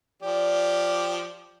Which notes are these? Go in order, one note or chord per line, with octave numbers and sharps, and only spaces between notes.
F3 G4 D5